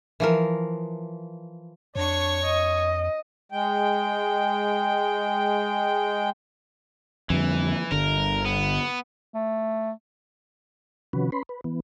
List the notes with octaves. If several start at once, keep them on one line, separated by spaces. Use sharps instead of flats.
E3 F3 A#4
F2 D4 C#5 C#6
D#5
G#3 G5
F2 D3 E3 G3
G1 D3 A#4
B3
A3
C3 D#3 F3 C#4 F#4 B4
C#4 B4 B5 C6
B4
E3 B3